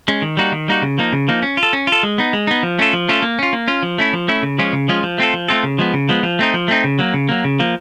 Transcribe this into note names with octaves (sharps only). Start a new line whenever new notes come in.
G#3 C#4
D#3
G3 A#3 D#4 F#4
D#3
G3 A#3 D#4 F#4
C#3
F3 A#3 D#4
C#3
F3 A#3 D#4
C#4
F4
A4
C#4
F4 A4
G#3
B3 D#4
G#3
B3 D#4
F3
A3 C#4 F4 A4
F3
A3 C#4 F4 A4
A#3
C#4 F4
A#3
C#4 F4
F3
A3 C#4 E4
F3
A3 C#4 E4
C#3
F3 G#3 C#4 F4
C#3
F3 G#3 C#4 F4
F3
A3 C4 F4 A4
F3
A3 C4 F4 A4
C#3
F3 G#3 B3
C#3
F3 G#3 B3
F3
A3 C4 D#4
F3
A3 C4 D#4
C#3
F#3 A#3
C#3
F#3 A#3
C#3
F3 A#3